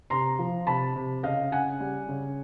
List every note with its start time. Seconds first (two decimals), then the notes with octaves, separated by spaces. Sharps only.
0.10 C3 A#5 C6
0.39 F3
0.67 C3 A5 B5
0.96 C3
1.23 C#3 D#5 F5
1.52 C#3 F#5 G#5
1.80 G3
2.09 C#3